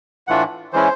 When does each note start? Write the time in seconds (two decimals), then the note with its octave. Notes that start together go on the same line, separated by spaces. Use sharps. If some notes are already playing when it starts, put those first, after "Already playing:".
0.27 A2 E3 A3 D4 F4 F#5
0.73 E3 G#3 C#4 E4 C5